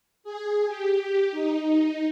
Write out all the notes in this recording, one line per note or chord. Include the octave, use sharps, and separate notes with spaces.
G#4
G4
D#4